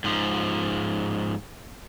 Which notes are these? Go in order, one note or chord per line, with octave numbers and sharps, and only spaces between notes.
G#2 F3